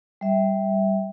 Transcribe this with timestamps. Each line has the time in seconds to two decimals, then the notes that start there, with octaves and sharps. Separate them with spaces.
0.21 G3 E5